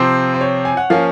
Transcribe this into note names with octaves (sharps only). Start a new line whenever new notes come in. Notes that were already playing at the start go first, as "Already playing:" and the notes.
Already playing: C3 F3 C4 C5
C5
C#5
G#5
F#5
F3 A#3 C#4 F5